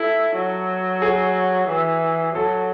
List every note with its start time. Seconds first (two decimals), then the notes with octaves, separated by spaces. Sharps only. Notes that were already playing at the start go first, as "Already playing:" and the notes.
Already playing: E4 A4
0.36 F#3
1.02 G#4
1.69 E3
2.35 F#3 A4